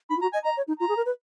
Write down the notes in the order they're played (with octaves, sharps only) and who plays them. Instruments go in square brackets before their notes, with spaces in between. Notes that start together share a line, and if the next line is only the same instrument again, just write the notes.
[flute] D#4 [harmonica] B5
[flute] F4
[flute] F#4 [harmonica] A#5
[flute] D#5 [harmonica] G#5
[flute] D#5 [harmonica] A#5
[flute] C#5
D#4
[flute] F4 [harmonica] A#5
[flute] G#4
A#4
B4